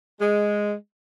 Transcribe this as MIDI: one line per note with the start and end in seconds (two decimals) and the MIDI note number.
0.20 0.74 56